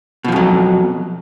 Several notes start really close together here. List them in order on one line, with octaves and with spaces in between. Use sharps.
B2 F3 F2 F#3